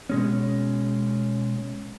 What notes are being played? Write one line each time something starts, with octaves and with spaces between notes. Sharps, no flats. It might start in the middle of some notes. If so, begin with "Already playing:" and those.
B2 G#3 C#4